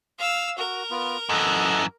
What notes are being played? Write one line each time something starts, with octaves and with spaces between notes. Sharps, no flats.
F5 E6
F#4 A#4
B3 F4
F#2 E3 A4 D#5 F#5